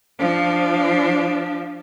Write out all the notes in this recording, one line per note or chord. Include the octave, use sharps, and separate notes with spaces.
F3 D4